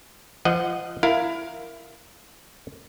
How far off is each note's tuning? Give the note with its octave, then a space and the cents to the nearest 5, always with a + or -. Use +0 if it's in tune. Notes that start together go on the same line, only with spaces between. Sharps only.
F3 -30 D#5 +0 F#5 +0
E4 +20 A#4 +0 F5 +15